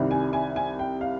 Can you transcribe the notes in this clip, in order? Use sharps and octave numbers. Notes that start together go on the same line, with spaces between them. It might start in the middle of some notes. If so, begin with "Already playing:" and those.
Already playing: C2 C3 D#3 G3 C4
G#5
G#5
G#5
G5
F5